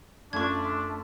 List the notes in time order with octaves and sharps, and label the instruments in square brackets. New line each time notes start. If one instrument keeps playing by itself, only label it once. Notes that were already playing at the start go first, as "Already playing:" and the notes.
[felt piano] F#2 F4 [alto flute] A3 [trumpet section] D4 [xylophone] C#6 G#6